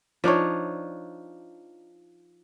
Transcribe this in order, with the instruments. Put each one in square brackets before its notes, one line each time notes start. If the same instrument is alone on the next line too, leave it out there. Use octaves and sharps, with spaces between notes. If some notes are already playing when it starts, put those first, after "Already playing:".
[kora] F3 D4 D#4 C#5